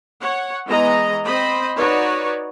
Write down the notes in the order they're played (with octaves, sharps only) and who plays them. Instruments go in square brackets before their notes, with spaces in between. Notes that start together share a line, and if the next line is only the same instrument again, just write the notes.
[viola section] C#5 F#5
E3 G#3 B3 D#5 A#5
C4 C5 D#5 B5
D#4 F#4 B4 C#5 D5